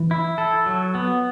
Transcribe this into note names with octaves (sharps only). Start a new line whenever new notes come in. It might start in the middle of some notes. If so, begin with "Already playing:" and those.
Already playing: E3
E4
A4
F#3
B3